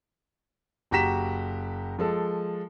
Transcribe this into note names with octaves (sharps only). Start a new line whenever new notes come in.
F#1 F#4 G4 A#5 B6 E7
F3 G#3 A4